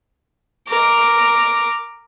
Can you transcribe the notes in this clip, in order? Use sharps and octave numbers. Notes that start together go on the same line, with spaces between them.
A#4 D6